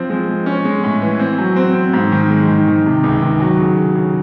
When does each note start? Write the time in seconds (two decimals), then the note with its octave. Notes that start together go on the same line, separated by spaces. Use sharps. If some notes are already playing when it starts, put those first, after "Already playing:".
Already playing: F3 C4
0.10 G#3
0.28 G#3
0.46 C#4
0.65 G#3
0.83 A2
1.02 E3
1.19 C4
1.38 F#3
1.56 C4
1.74 C4
1.93 G#2
2.12 D#3
2.30 G#3
2.48 D#3
2.67 D#3
2.86 C3
3.03 C#2
3.22 D#3
3.40 F#3
3.59 C#3
3.77 C#3
3.95 C#3